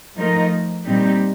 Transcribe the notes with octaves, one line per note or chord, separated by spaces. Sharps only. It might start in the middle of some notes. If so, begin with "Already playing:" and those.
F3 A3 D#4 A#4 D#5
A#2 G3 C4 D#4 G4